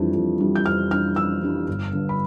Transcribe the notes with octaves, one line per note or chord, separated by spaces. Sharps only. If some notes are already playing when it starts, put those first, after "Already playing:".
Already playing: F2 E3 G3 D4
F2
E3 G3 D4
G6
F2 F6
E3 G3 D4 F6
F2 E6
E3 G3 D4
G1
G2 D3
B5